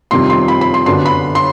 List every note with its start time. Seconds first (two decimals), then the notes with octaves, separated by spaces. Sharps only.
0.11 F2 C3 D#3 G3 C4 C6
0.30 C6
0.48 B5
0.61 B5
0.74 C6
0.86 F#2 D3 F#3 B3 D4 C6
1.05 B5
1.35 C6